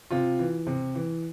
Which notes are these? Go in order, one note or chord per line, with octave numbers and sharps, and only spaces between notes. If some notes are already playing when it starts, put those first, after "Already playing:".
C3 F4
E3
C3
E3